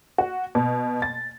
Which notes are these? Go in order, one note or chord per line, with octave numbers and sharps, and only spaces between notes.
F#4
B2
A6